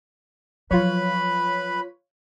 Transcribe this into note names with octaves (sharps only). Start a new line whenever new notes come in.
F3 F#3 F4 B4 C#5 B5